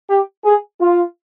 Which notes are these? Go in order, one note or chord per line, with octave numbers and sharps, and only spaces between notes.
G4
G#4
F4